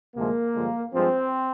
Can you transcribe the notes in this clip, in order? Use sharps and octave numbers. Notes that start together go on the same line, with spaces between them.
D2 C3 F3 G#3 A#3
G2 D3 F3 G#3
G2 F3 G#3 C4